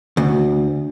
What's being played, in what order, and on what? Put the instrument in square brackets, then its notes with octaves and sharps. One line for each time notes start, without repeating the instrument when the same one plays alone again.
[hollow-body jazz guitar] D2